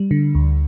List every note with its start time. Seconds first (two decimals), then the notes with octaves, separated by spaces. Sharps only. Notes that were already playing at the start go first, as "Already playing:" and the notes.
Already playing: G3
0.11 D3
0.35 D2